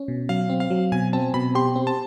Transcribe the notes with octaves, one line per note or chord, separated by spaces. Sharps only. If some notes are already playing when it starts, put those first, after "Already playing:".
Already playing: C#4
B2
F#3 F5
C4
F5
F#3
B2 G#5
C4 A5
B2 B5
G4 C6
C4
A5